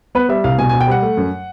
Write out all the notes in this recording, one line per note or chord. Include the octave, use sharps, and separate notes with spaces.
B3 B4
G3 E5
C2 F5
B2 G#5
G#5
B2
G5
G3 F#5
A3
F#2